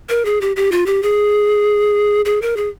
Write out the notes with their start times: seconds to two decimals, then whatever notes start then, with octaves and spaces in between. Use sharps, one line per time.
0.09 A#4
0.25 G#4
0.41 G4
0.56 G4
0.72 F4
0.86 G4
1.03 G#4
2.25 G#4
2.42 A#4
2.57 G#4